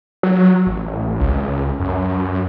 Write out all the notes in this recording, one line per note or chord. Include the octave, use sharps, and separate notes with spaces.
F#3
A1
C#2
F#2